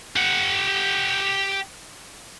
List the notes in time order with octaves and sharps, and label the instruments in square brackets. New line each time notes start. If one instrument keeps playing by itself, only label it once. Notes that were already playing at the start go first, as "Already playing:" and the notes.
[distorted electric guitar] G4 F#5